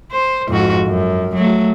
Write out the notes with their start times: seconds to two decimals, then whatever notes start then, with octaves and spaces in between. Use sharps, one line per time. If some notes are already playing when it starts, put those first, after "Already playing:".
0.11 C5
0.49 F2 G#2 F#4
0.86 F#2
1.36 F#3 A3